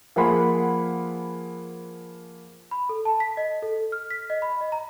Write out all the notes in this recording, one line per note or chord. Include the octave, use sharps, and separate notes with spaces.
F3 A#3 G#4 F#5 B5 C6
B5
A4
A5
B6
D#5
A4
F6
B6
D#5
B5
D#5
A#5